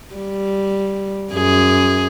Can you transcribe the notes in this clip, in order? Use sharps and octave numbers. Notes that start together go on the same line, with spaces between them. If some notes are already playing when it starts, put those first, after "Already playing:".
G3
F#2 G#4